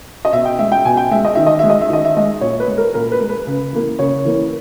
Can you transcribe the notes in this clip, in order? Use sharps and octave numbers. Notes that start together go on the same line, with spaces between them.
D#5
B2 E5
G5
G#3 E5
G5
B2 G#5
G5
G#3 E5
D#5
D#3 E5
D#5
G#3 E5
D#5
E5
D#3 D#5
E5
G#3 D#5
A#2 C#5
B4
G#3
A#4
A#2 A#4
B4
G#3
B4
C#3
E3 A#3
C#3 C#5
E3 A#3